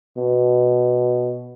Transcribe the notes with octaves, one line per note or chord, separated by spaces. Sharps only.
B2